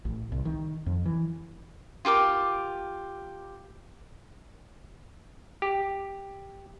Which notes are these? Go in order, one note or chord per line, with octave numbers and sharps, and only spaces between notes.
A1
C2
D#3
F2
E3
F4 G4 A#4 D6
G4